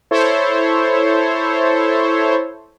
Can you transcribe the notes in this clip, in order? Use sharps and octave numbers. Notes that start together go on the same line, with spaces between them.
E4 A4 C5 C#5